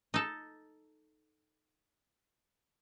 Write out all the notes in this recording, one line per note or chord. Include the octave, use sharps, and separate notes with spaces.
D#4 A4